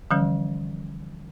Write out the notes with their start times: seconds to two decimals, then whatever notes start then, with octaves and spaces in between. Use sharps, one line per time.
0.11 D3 E3 F3 G3 C#4